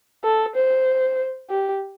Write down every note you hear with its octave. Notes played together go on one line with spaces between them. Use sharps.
A4
C5
G4